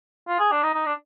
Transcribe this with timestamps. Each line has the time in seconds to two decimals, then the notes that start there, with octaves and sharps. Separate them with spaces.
0.28 F4
0.40 G#4
0.52 D4
0.63 D#4
0.74 D#4
0.86 D4